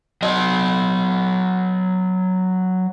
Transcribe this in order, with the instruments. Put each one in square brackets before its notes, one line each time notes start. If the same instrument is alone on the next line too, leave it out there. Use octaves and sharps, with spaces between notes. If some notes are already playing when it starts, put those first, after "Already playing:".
[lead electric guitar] F#3 D#5